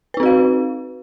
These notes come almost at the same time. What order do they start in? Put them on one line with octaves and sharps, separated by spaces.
B4 D#4 C4 F#4 F5